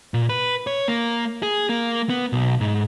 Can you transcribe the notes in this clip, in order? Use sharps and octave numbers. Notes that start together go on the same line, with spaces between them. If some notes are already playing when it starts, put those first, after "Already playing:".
A#2
B4
C#5
A#3
G#4
A#3
B3
B1
G#2